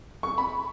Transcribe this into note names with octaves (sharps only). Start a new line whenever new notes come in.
C#6
B5